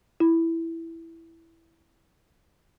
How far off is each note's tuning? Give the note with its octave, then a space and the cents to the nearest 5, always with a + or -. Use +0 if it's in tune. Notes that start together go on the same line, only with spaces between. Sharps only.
E4 +0